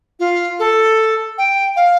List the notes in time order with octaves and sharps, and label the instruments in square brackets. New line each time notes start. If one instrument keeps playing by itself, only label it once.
[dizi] F4
A4
G5
F5